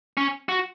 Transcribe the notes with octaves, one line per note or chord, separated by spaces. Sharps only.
C#4
F#4